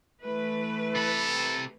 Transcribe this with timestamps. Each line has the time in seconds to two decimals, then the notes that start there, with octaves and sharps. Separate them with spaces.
0.24 E3 A3 B4
0.95 C3 A4 B5